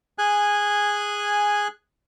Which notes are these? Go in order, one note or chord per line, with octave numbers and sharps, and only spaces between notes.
G#4 G#5 F#6